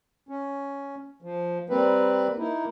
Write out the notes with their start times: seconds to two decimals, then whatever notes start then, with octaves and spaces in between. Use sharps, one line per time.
0.29 C#4
1.22 F3
1.70 G3 A#3 C4 B4
2.38 A#3 D#4 E4